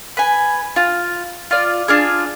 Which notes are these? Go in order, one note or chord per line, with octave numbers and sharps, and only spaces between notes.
B4 G#5
F4
F4 D5
D4 F4 G#4